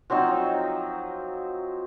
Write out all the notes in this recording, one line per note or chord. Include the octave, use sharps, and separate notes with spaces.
F3 F#3 C4 D#4